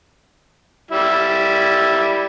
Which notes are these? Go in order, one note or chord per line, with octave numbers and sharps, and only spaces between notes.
G3 E4